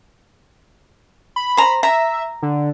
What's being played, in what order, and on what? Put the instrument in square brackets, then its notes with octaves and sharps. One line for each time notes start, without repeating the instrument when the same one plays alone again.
[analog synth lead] B5
[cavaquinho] C5 A#5
[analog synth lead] E5 [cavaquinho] A#5
[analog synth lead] D3